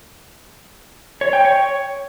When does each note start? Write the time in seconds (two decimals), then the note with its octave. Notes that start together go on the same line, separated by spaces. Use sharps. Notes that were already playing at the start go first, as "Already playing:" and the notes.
1.21 C#5
1.33 G5
1.45 C#5